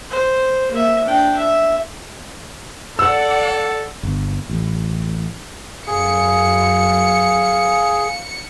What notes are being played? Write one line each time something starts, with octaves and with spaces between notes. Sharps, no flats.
C5
A#3 E5
D4 G5
E5
A4 D5 F#5 E6
G1
A1
F#2 G#4 F5 C#7